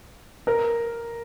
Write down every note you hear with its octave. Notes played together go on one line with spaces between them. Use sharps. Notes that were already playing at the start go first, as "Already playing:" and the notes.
A#4